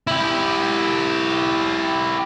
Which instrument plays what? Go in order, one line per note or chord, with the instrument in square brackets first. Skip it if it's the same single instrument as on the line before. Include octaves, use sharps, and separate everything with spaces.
[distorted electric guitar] E4 G4